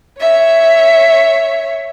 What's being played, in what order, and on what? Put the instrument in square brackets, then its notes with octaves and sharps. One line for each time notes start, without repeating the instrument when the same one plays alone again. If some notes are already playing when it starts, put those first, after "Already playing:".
[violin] C#5 E5